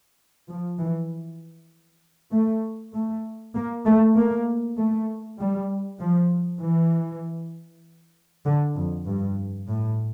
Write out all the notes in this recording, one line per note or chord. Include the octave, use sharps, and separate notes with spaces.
F3
E3
A3
A3
A#3
A3
A#3
A3
G3
F3
E3
D3
F2
G2
A2